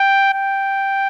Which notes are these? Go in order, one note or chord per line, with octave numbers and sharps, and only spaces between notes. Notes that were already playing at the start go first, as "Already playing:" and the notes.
Already playing: G5
G5